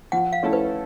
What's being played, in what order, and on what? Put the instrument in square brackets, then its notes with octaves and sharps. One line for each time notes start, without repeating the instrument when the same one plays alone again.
[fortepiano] F3 [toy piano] F#5
[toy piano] F5
[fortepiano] A3 C#4 E4 A4
[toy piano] B4